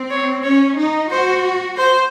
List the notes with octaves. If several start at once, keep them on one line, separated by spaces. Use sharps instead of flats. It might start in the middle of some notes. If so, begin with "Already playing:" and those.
Already playing: C4
C#5
C#4 C#5
D#4
F#4 C5
C5